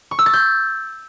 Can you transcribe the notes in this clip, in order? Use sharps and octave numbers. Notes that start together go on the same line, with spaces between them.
C#6
E6
A6
G6